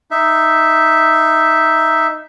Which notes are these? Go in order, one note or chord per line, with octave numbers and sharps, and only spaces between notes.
D#4 E5